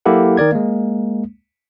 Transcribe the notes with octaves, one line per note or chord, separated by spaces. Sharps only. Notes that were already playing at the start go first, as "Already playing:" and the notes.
F#3 A#3 E4 G4 A4 F#5
D#3 A#4 D5 G#6
G#3 A#3